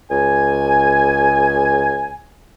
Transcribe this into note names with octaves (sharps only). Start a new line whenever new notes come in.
C#2 G#5